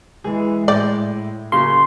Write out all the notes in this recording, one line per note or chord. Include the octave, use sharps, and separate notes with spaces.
E3 G#3 G#4
A2 G#3 D5 G5
C#3 F#3 A#3 C6